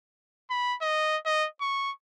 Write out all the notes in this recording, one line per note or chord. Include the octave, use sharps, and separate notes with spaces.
B5
D#5
D#5
C#6